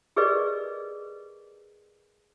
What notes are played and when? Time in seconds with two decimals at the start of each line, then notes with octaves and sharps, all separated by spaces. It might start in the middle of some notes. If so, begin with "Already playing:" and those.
0.16 G4 G#4 A#4 B4 D5 D#5